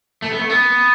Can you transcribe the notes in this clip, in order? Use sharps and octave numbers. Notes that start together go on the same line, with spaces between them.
A3
B3
A3
B3